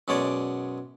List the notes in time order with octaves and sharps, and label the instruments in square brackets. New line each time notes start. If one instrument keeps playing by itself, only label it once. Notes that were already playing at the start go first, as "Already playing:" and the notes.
[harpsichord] F#2 B2 G#3 C#5 D5